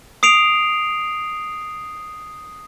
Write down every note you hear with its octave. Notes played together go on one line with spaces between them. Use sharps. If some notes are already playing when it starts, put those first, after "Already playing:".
D#6 C7 D7 F7